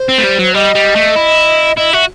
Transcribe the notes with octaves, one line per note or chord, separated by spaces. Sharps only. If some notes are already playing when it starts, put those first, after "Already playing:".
Already playing: C5
C4
A3
G3
F#3
G3 D#5
G3
A3
E4
E4 D#5
F#4 E5